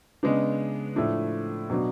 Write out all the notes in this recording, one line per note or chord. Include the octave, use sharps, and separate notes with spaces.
C#3 G#3 B3 D4
A2 F3 A3 D4
B2 F#3 B3 D4